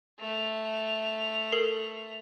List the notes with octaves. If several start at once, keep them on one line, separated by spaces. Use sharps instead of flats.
A3 F7
A4 A#4 C7